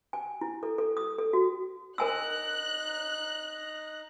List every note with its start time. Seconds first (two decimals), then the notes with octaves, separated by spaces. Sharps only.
0.13 G#5
0.41 E4
0.63 A4
0.78 A4
0.97 D#6
1.18 A4
1.33 F#4
1.98 D#4 A#4 G#5 A#5 E6 F#6